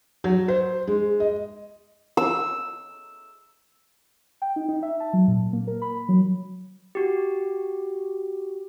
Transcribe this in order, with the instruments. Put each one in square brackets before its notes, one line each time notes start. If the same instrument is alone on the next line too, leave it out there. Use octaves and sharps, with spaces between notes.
[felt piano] F#3
C5
G#3
D#5
[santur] E6
[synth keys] G5
D#4
D#4
E5
A5
F#3
A#2
A#3
A#4
B5
F#3
[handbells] F#4 G4